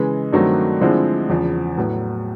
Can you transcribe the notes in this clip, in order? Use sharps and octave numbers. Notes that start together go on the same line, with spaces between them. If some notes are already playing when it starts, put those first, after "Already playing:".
Already playing: C#3 E3 G#3
G2 D#3 F#3 A3 C4
D3 F3 G#3 C4 E4
E2 C#3 F3
A2 F#3 B3